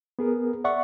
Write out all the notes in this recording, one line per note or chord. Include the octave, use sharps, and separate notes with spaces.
B3 G#4 A#4
D5 E5 F#5 C#6